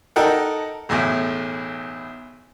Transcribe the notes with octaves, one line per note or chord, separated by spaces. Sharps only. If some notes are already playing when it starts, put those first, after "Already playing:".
D#4 A4 A#4 F#5 G5
B1 E2 A2